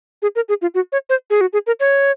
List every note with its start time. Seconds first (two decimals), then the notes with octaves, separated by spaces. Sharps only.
0.22 G#4
0.36 A#4
0.49 G#4
0.62 F4
0.75 F#4
0.92 C#5
1.10 C5
1.30 G#4
1.41 F#4
1.53 G#4
1.67 A#4
1.80 C#5